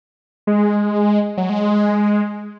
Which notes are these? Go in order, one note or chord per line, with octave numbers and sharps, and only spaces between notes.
G#3
F#3
G#3